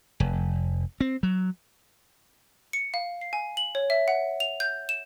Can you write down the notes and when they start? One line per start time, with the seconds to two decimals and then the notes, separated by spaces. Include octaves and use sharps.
0.20 F1
1.00 C4
1.23 F#3
2.73 C#7
2.94 F5
3.21 C7
3.33 G#5
3.57 F#7
3.75 C#5
3.90 E5
4.08 F#5
4.40 F7
4.60 G6
4.89 E7